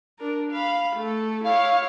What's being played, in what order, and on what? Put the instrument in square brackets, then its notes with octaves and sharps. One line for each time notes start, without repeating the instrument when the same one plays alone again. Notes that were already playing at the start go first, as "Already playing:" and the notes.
[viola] D4 A#4
F5 B5
A3 A4
[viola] E4 C#5 [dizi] F5